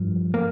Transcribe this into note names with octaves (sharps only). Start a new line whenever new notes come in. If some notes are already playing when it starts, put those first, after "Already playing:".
Already playing: G2 F3
A#3